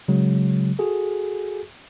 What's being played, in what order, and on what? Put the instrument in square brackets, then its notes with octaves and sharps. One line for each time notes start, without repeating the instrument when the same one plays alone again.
[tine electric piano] C#3 F#3 G#3
F#4 G#4 A4